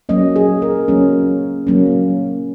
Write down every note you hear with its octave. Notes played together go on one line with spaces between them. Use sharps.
F#3 A#3 C#4 D#5
G#4
A#4
F#3 A#3 C#4
F#3 A#3 C#4